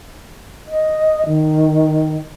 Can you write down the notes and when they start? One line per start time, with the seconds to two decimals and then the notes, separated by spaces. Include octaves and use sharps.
0.68 D#5
1.26 D#3